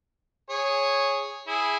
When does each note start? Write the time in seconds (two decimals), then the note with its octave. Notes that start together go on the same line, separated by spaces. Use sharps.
0.50 G#4 C#5
1.47 E4 G#4